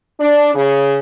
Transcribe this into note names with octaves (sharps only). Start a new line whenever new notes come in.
D4
C#3